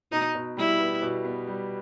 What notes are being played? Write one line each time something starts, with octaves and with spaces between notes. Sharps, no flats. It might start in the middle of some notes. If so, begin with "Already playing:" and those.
B2 D#4
B2
G3 E4
B3
B2
B3
G3